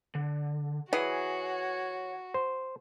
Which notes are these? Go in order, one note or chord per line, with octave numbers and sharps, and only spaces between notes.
D3
E3 F#4 G#4 C#5 F#5
C5